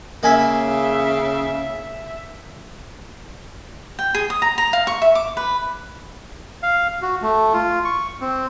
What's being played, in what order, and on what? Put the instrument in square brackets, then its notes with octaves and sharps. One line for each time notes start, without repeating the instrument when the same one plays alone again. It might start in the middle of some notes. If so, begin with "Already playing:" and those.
[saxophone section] C#3 [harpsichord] A#3 G#5 B5 [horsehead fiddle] E5
[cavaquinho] G5
G#4
D#6
A#5
A#5
F5
C#6
E5
D6
B4
[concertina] F5
F#4
A3
F4
C#6
C4